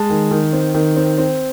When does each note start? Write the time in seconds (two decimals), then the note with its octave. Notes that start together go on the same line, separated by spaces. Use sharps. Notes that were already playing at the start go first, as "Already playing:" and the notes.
Already playing: G#3 A5
0.10 D#3
0.31 D#3
0.53 C4
0.74 D#3
0.96 C4
1.18 C4